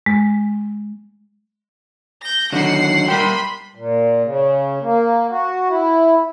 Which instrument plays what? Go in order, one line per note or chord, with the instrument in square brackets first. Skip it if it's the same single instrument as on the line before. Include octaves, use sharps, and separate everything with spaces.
[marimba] G#3
[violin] G6 A#6
[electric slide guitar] D3 D#3 F#3 [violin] F#5 C7
[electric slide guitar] G3 A#4 G5 [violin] B5 C6
[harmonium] A#2
C#3
A#3
F#4
E4